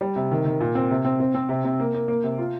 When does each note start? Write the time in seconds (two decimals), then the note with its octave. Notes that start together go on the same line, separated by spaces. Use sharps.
0.01 G3
0.16 C3
0.31 D#3
0.45 D#3
0.60 A#2
0.75 C4
0.91 C3
1.05 C4
1.20 C4
1.34 C4
1.49 C3
1.64 C3
1.80 A#3
1.94 A#3
2.08 A#3
2.24 C3
2.38 F4